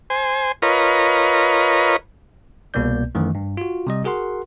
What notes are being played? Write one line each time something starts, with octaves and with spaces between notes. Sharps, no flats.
C5 G#5
F4 A#4 B4 C#5 D#5
C2 B2 A#3 B3 D5 G6
F#2 D#3 E3 A3
G2
F4 F#4
C3 G3 D#5
F#4 G#4 A#4 F#5 C6